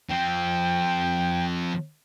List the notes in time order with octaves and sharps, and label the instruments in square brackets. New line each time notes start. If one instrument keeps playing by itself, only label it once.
[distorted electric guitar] F3 C4 [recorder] G5